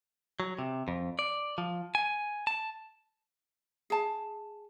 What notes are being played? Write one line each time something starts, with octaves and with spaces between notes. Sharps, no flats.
F#3
C3
F2
D5
F3
G#5
A5
G#4 A5